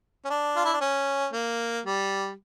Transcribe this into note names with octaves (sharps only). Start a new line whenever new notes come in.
C#4
D4
F4
E4
D4
C#4
A#3
G3